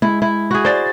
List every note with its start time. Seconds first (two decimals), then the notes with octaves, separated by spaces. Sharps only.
0.02 G#3 E4
0.22 E4
0.51 F#4 G#4
0.65 C5 D5 A6